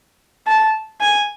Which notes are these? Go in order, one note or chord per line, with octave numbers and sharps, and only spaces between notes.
A5
G#5